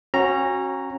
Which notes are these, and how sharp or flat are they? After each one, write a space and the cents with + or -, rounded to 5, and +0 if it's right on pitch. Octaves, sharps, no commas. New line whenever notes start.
C#4 -30 F#4 +0 A#5 +0